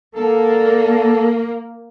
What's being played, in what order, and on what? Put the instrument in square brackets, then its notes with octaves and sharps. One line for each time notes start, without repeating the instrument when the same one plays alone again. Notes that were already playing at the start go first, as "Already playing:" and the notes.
[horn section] D3 A4 [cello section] A#3